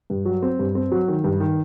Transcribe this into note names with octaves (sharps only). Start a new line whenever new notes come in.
G2
F#3
C4
G2
C4
F#3
D#3
G2
D#3